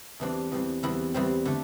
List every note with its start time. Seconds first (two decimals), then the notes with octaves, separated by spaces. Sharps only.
0.20 E2 E3 G3 C4 D4
0.52 E2 E3 G3 C4
0.83 E2 E3 G3 C4 E4
1.14 E2 E3 G3 C4
1.45 D3 A3